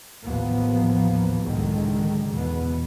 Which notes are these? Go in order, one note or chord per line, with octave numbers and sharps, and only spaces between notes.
A1 D#2 F3 A#3 B3
C#2 F#2 A2 D3 D#3 G#3
E2 B2 B3